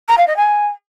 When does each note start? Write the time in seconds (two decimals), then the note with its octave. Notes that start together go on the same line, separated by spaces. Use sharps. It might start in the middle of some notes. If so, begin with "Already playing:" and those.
0.08 A#5
0.18 F5
0.27 D#5
0.37 G#5